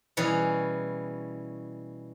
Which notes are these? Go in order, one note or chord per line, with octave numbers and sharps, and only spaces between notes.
B2 E3 G3 C#4 G#4